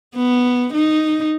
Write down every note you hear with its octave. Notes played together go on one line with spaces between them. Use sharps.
B3
D#4